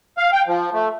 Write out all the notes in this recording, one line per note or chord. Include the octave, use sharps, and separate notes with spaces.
F5
G5
F3
A3